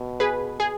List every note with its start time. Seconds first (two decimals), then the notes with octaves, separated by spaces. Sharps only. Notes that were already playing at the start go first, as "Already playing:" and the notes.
Already playing: B2
0.20 G#4 B4
0.60 G#4